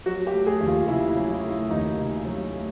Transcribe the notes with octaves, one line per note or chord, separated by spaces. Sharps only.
F#3 F#4
G4
A3
G#4
D#2
F4
C#3 E4
E4
F#3
E4
A3
E4
D#2 D#4
C#3
F#3
A3